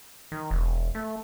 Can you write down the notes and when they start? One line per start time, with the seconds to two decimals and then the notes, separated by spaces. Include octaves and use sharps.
0.32 D#3
0.50 E1
0.95 A3